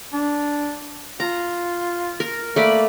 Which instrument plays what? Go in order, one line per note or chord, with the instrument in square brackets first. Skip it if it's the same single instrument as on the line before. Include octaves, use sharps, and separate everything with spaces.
[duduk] D4
[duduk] F4 [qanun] A#5
[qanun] A#4
[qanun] A3 D5 B5 [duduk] A#3